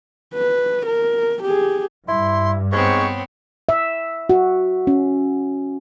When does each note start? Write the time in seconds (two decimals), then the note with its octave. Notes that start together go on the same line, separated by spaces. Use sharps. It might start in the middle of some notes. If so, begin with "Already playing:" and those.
0.34 B4
0.86 A#4
1.43 G4 G#4
2.08 G2 E4 C6
2.72 G#2 B3 C4 C#5 C#6
3.69 E5
4.30 F#4
4.87 C#4